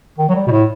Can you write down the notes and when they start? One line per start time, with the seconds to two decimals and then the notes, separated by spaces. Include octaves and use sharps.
0.18 D#3
0.29 F#3
0.35 G3
0.47 B2
0.51 A2